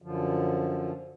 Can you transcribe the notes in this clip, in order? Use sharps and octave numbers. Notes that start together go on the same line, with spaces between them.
F#2 D3 F3